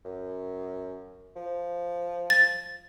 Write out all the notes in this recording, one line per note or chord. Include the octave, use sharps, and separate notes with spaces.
F#2
F3
A6